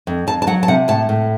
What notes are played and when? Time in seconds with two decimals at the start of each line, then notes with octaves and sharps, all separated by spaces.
0.07 F2
0.27 F2 A5
0.42 A5
0.47 F#3 F#5
0.63 A5
0.68 C3 F#5
0.88 A2 A5
1.09 A2